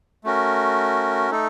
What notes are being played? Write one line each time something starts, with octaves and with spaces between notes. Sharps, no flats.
A3 C#4 F#4 A#4
A3 D#4 A4